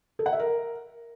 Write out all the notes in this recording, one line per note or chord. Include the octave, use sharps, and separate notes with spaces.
A4
F#5
E5
A#4